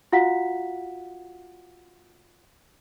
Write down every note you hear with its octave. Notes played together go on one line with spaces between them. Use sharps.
F4 F#4 F5 F#5 B6